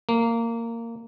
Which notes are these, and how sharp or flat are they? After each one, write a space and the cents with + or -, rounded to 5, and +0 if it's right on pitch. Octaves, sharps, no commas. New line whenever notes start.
A#3 -15